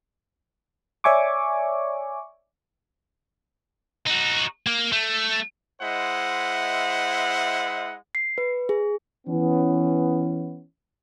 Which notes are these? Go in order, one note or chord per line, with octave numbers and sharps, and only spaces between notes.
C#5 D5 E5 G#5 C#6 D6
D#4 F#4
A#3
A3
G#3 E4 C5 D#5 E5 F#5
C7
B4
G#4
E3 B3 C#4